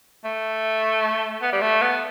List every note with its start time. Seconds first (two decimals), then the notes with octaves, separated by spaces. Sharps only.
0.24 A3
1.42 B3
1.52 G3
1.61 A3
1.81 B3